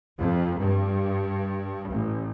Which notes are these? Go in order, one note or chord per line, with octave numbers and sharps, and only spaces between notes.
F2
G2
A1